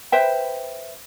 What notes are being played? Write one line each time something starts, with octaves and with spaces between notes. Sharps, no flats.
B4 C5 E5 G5